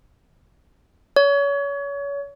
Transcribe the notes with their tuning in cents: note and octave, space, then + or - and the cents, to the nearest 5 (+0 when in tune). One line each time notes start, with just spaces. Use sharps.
C#5 +30